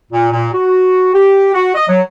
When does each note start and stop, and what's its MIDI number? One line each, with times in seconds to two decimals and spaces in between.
0.12 0.29 46
0.32 0.48 46
0.53 1.11 66
1.14 1.51 67
1.54 1.72 66
1.75 1.87 75
1.88 2.01 54